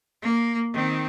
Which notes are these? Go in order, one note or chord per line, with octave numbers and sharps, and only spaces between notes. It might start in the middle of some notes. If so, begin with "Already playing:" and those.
A#3
D#3 C4